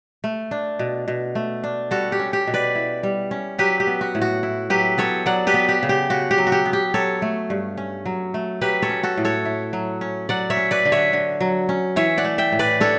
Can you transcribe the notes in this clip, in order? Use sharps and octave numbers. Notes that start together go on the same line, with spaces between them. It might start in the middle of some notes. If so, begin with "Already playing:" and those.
A3
D4
B2
B2
A3
D4
G3 F#4 A4
G4
C#4
G4
B2
B4 D5
E4
G3
C#4
F#3 G4 B4
G4
B3
F#4
A2
F#4
E4
F#3 G4 B4
B3 A4 C#5
F#3 D5 F#5
G4 B4
B3
G4
C#3
G4
C#3 F#4
G4
F#3
F#4
G4
B3
G4
F#3 A4 C#5
A3
G2
C#4
F#3
A3
F#3 G4 B4
A4 C#5
C#4
F#4 A4
A2
A4 C#5
E4
F#3
C#4
F#3 D5 F#5
C#5 E5
C#4
B4 D5
D3
C#5 E5
D3
F#3
C#4
E3 C#5 E5
D5 F#5
A3
E5 G5
A2
B4 D5
D4 A4 C#5